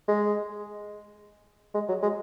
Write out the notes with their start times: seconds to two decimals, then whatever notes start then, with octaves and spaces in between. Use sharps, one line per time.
0.08 G#3
1.74 G#3
1.89 F#3
2.02 G#3